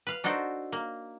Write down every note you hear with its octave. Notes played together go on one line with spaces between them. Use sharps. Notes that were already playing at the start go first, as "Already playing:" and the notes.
B4 F5
D4 D#4 F#4 A4 C5
A#3